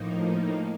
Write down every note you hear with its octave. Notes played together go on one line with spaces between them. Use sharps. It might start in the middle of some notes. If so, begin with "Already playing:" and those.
Already playing: A2 F3 A#3 D#4